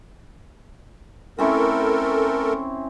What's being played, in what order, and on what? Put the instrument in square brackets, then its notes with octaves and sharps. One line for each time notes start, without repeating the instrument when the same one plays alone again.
[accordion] A3 A4 A#4 [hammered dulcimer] C4 C#4 E4